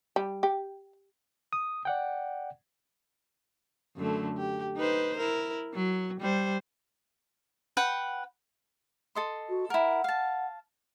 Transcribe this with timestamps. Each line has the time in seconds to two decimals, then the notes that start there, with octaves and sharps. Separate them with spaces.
0.16 G3
0.43 G4
1.53 D#6
1.85 D5 F#5 G5
3.96 F#2 D3 A3
4.38 G4
4.76 D#4 B4 C5
5.17 E4 A#4
5.74 F#3
6.20 G3 C5
7.77 B4 F#5 G5
9.15 A4 D#5 C6
9.49 F#4
9.70 E4 A#4 F#5
10.04 F5 A5